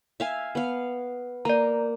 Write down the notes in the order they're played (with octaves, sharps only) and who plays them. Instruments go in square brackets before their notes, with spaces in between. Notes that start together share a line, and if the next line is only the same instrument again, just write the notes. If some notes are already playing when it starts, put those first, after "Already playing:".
[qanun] E5 F5 G#5
B3 F5
[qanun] A#3 [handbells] D5 A#5